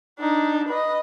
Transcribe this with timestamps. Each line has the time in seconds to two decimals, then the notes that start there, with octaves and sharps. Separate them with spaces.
0.19 D4 D#4
0.69 B4 D#5